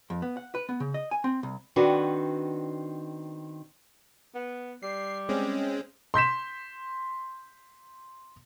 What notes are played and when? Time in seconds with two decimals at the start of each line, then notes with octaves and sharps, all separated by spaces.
0.10 F2
0.22 B3
0.37 F#5
0.55 B4
0.69 B3
0.80 C#3
0.94 D#5
1.11 G#5
1.24 C4
1.43 C2
1.76 D#3 C4 D4 F#4 A4 B4
4.34 B3
4.83 G3 C7
5.29 G#3 C4 C#4
6.14 C6 G6 B6 E7